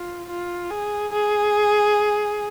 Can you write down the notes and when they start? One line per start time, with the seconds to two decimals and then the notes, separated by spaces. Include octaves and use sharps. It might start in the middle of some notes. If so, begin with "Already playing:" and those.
Already playing: F4
0.29 F4
0.71 G#4
1.12 G#4